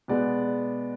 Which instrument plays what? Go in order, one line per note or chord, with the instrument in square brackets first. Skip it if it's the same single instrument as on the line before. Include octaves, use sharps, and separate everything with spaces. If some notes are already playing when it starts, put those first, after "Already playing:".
[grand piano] B2 G#3 B3 D5